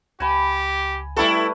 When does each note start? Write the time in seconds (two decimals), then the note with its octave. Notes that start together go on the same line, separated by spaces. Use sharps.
0.20 C#2 G4 G#5 B5
1.16 G3 A3 E4 A4 B4